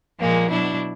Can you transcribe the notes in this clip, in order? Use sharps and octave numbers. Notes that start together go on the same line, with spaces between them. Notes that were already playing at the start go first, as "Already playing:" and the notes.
A#2 F3 G#3 A#3
B2 F#3 D4 E4